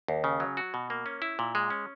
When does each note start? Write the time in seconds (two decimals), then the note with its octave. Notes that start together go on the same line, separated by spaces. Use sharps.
0.08 D#2
0.24 C#3
0.40 F#3
0.57 F#4
0.74 B2
0.90 A#3
1.06 C#4
1.22 E4
1.39 A#2
1.55 G#3
1.70 C#4